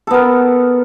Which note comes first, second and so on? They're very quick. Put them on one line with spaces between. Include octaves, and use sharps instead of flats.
A4 B3 A#4